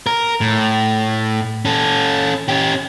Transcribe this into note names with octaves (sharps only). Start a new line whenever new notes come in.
A#4
A2
C#4 A4
C#4 G4